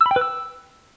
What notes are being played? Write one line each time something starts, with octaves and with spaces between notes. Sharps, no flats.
E6
B5
G5
B4
E6